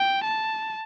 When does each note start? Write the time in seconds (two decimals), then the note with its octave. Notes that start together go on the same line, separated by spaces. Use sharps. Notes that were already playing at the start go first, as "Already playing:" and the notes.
Already playing: G5
0.24 A5